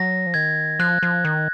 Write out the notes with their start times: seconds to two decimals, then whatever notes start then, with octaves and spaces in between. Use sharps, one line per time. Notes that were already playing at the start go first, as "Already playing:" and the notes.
Already playing: F#3 A#6
0.27 F3
0.34 D#3 G#6
0.79 F3 F#6
1.03 F3
1.24 D#3